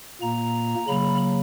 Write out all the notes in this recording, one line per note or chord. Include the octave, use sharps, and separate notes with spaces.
A#2 A#3 A#5
C#3 F#3 A#3 B5